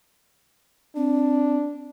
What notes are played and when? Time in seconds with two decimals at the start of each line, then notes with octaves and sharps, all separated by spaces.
0.96 C4 D4